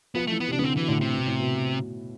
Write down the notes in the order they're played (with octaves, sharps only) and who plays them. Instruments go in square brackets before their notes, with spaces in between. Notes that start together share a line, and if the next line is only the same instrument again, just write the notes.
[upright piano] F3 [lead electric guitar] B3
[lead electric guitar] A3
[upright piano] E3
[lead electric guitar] B3
[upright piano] C3
[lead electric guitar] D4
[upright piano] D3 [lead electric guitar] B3
[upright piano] C3 [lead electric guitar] C4
[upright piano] B2 [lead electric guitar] E3
[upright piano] A2 [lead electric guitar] D3
[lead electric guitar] C3
[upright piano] B2
A2
B2